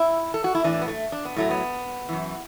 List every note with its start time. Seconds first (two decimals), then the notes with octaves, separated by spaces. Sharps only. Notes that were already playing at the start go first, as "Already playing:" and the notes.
Already playing: E4
0.34 A4
0.44 F#4
0.55 E4
0.64 A2 E3 D4
0.82 B3
0.88 A3
1.12 D4
1.25 B3
1.36 A2 F#3 A3
1.50 B3
2.09 F#2 E3